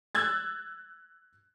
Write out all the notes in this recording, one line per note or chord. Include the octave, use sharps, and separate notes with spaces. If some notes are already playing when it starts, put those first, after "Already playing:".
E6 F#6 G#6 A6